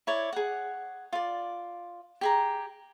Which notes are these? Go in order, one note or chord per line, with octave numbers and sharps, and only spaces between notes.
E4 C#5 D5
G#4 F#5
F4 D5
G4 G#4 A#5